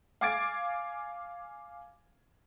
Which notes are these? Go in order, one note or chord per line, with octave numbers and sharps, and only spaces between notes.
F5 G#5 D6 G#6 A6 D7